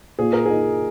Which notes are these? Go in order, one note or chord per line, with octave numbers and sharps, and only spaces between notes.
A#2 G#4
A#4
D#4 G#4